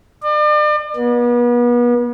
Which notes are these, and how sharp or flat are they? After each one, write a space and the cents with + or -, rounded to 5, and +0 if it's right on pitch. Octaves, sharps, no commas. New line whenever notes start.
D5 +40
B3 -35